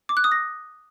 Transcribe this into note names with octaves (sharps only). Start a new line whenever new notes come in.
D6
F#6
D#6
A#6